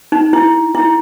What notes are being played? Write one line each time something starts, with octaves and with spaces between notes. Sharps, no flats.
D#4
E4
E4